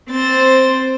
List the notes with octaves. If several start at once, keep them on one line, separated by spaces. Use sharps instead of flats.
C4 C5 A6